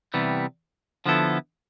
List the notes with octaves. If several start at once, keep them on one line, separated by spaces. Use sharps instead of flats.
C3 E3 G3 B3
D3 F3 B3 E4 A4